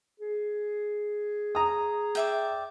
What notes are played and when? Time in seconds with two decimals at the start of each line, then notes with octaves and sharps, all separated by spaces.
0.20 G#4
1.55 A#5 D#6
2.15 D5 E5 G5